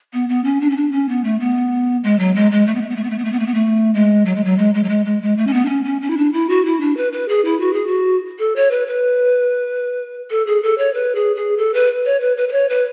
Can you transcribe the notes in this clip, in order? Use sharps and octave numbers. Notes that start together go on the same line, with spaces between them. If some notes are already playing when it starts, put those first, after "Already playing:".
B3
B3
C#4
D4
C#4
D4
C#4
B3
A3
B3
G#3
F#3
G#3
G#3
A3
B3
A3
B3
A3
B3
A3
B3
A3
B3
A3
B3
A3
G#3
F#3
G#3
F#3
G#3
G#3
F#3
G#3
G#3
G#3
A3
C#4
B3
D4
C#4
C#4
C#4
E4
D4
E4
F#4
E4
D4
B4
B4
G#4
E4
F#4
G#4
F#4
A4
C#5
B4
B4
A4
G#4
A4
C#5
B4
G#4
G#4
A4
B4
C#5
B4
B4
B4
C#5
B4